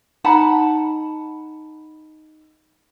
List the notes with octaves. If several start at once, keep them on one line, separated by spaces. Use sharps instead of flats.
D#4 F#5 A5 B5